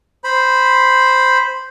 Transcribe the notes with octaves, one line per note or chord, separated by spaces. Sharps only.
C5 B5